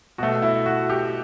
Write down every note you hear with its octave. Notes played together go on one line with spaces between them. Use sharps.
B2 A3 F#4
E4
F#4
G4